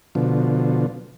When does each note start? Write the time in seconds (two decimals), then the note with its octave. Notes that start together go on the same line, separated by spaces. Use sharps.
0.15 B2 D3 F3